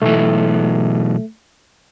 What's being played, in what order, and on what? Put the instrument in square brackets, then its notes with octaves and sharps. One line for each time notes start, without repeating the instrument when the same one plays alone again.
[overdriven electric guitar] B1 E3 [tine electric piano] A3